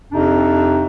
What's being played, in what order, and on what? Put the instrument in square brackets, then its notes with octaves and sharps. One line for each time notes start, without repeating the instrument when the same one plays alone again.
[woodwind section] F2 C3 D4 D#4